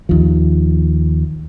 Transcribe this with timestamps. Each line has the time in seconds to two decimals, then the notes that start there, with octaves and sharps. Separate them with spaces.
0.09 D#2 F3